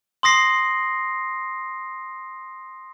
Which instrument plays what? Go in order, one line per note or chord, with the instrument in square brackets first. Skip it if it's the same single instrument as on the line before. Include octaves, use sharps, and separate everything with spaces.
[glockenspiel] C6 D#6 A#6 C7